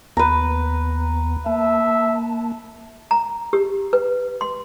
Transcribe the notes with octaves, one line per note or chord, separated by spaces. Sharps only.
D#2 B3 B4 A#5
A#3 E5 A5
A#5
G4
B4
C6